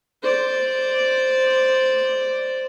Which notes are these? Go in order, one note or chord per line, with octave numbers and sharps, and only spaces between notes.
C5 D5